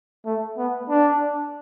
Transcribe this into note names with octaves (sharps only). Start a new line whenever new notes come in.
A3
B3
D4